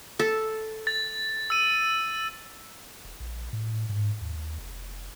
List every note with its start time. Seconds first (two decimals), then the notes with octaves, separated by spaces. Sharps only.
0.20 A4
0.87 A6
1.50 E6 D#7
3.05 D#1
3.20 A#1
3.53 A2
3.89 G#2
4.21 D#2
4.58 F1